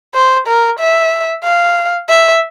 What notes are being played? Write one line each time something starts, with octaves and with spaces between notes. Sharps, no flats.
C5
A#4
E5
F5
E5